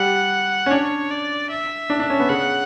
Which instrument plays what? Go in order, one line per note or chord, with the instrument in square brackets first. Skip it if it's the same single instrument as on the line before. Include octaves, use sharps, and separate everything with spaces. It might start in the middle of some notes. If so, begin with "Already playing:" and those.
Already playing: [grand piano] G3 [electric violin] F#5
[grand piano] C#4
[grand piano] D4 [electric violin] C#5
[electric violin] D5
E5
[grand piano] D4
D4
C#4
B3
[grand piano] C#3 [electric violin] F#5